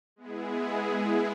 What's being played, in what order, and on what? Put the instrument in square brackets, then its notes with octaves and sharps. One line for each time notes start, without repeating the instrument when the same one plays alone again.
[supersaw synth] G#3 B3 E4 G#4